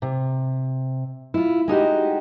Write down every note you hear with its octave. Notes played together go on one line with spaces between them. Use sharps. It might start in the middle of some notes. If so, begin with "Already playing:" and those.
C3
E4 F4
G#3 D#4 F#4 G4